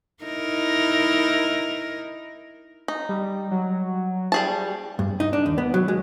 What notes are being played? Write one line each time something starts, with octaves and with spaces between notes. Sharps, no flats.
D#4 E4 A#4
D#4
G3
F#3
G3 G#4 A5
G2
D#4
D4
D#2
B3
F#3
G#3